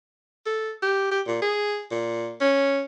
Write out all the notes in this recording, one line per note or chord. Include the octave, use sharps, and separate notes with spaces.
A4
G4
G4
A#2
G#4
A#2
C#4